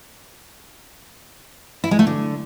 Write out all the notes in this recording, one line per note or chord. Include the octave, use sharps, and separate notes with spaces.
E4
G#3
A3
D3